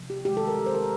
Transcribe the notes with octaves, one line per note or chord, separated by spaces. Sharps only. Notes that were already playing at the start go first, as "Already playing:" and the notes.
Already playing: C3 F3 A#3
G4
D#3 G#3 G4
A4
A#4
C5
A#4